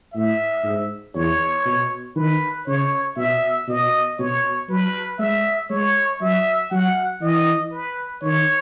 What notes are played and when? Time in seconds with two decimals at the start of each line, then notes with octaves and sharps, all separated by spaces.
0.14 A2 E5
0.64 G#2
1.15 E2 C#5
1.65 B2
2.16 D#3 B4
2.67 C#3 C#5
3.17 B2 E5
3.68 B2 D#5
4.19 B2 C#5
4.69 F#3 B4
5.19 G#3 E5
5.70 G#3 C#5
6.21 F#3 E5
6.71 F#3 F#5
7.22 E3 D#5
7.72 B4
8.22 D#3 C#5